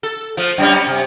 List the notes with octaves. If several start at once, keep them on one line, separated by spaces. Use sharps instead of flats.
A4
F3 A3
F#2 G3 C#4
C3